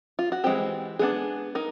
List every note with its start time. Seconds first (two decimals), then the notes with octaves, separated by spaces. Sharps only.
0.19 F4
0.32 F#4
0.44 E3 G#3 C4 G4
0.99 G#3 B3 D4 G#4
1.55 D#4 A#4